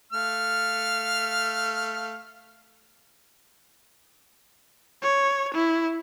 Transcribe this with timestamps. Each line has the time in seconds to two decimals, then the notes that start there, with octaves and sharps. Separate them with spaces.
0.13 A3 F5 F6
5.02 C#5
5.54 E4